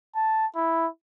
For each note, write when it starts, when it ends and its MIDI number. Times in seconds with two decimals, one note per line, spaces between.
0.15 0.46 81
0.55 0.87 64